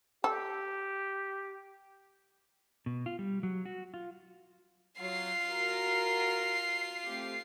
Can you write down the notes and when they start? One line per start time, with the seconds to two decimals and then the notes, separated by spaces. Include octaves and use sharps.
0.24 G4 A4
2.86 B2
3.06 F4
3.19 G3
3.43 F#3
3.65 F#4
3.94 F4
5.00 F#3 F4 C7
5.48 F#4 A#4
7.06 A3 C4 G4